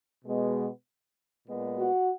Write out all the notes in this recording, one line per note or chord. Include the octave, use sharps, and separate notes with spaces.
B2 G#3 B3
A#2 G#3 B3
F#4 F#5